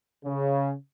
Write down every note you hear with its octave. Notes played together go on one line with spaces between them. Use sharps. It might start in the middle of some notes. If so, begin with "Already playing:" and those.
C#3